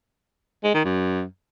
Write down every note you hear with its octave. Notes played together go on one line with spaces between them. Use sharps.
G#3
D#3
F#2